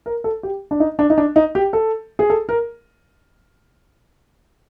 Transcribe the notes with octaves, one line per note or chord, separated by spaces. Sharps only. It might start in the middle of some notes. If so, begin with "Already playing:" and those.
A#4
A4
G4
D4
D#4
D4
D#4
D4
D#4
G4
A4
G#4
A4
A#4